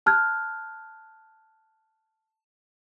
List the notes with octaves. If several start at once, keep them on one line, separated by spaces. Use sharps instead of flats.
A5 F6 F#6 G#6